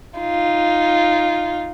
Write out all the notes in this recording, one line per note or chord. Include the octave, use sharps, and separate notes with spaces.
D#4 F4